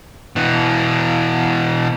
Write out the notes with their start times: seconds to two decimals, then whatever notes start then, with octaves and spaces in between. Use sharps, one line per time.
0.36 B2 E3